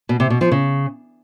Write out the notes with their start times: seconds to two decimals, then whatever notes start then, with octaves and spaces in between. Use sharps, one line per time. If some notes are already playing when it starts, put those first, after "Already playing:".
0.09 B2
0.20 C3
0.30 B2
0.41 F3
0.52 C#3